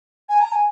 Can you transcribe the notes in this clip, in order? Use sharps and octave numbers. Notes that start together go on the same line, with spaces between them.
G#5
A#5
G#5